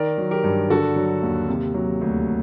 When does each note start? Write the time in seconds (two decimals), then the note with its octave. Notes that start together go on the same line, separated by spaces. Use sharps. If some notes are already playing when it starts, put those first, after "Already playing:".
Already playing: D#3 A#4 D5
0.18 F#3
0.31 G4 A#4
0.44 G2
0.70 D3 F#4 A4
0.96 F#3
1.23 D#2
1.48 C3
1.74 F#3
2.01 D2